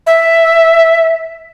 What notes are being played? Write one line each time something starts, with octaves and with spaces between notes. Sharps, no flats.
E5